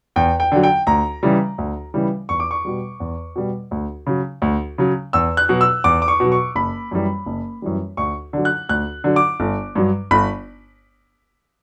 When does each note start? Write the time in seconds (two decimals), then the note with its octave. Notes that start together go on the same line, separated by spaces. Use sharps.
0.16 E2 G5
0.40 G5
0.52 D3 F#3
0.63 G5
0.87 D2 A#5
1.23 C#3 E3 G3
1.58 D2
1.94 C#3 E3 G3
2.29 E2 C#6
2.40 D6
2.51 C#6
2.65 B2 G3
3.00 E2
3.36 B2 G3
3.71 D2
4.07 C#3 F#3
4.42 D2
4.78 C#3 F#3
5.13 E2 E6
5.37 F#6
5.49 B2 F#3
5.61 E6
5.84 E2 D6
6.02 D6
6.08 C#6
6.20 B2 F#3
6.32 C#6
6.56 F#1 B5
6.91 F#2 E3 G3
7.26 F#1
7.62 F#2 E3 G3
7.97 D2 C#6
8.33 D3 F#3
8.45 F#6
8.69 D2 F#6
9.04 D3 F#3
9.16 D6
9.40 G1
9.75 G2 F#3
10.11 G1 B5